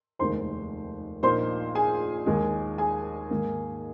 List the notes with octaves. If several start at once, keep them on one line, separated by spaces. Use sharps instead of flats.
F1 D#2 D#3 G#3 C5 C6
A#1 A#2 A#3 D#4 C5 C6
G#4 G#5
D#2 D#3 G#3
G#4 G#5
G#2 D#3 A#3